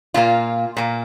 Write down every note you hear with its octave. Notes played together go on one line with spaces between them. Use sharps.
A#2 A#3 F4
A#2 A#3